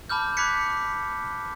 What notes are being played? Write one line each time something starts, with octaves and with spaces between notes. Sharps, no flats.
A5 B5 D6 F6 G6
B5 D6 F#6 G#6 B6 C#7